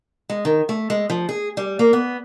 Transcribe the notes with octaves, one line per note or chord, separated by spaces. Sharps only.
G#3
D#3
A3
G#3
F3
G#4
G3
A#3
B3